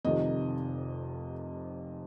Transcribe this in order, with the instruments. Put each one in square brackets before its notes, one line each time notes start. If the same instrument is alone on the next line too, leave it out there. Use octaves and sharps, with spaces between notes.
[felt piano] F1 F2 C3 D#3 D#5